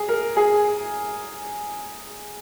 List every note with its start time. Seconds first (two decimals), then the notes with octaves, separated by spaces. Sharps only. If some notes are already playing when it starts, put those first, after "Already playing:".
Already playing: G#4
0.09 A#4
0.37 G#4